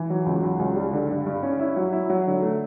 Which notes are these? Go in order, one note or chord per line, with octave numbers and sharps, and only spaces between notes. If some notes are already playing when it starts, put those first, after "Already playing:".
Already playing: E3
F#3
C#2
F#3
C#2
G3
D3
G2
G2
C#4
E4
F#3
E4
F#3
D3
A3